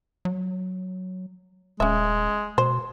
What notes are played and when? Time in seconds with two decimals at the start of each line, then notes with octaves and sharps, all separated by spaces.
0.25 F#3
1.80 D#1 G#3 C#4 E5
2.58 B2 C5